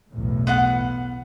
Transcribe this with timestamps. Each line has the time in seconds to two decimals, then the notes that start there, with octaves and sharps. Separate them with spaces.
0.10 B1 E2 A2
0.47 B3 F5 F#5